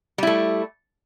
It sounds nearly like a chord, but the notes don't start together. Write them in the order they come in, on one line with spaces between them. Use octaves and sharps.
G3 E4 A3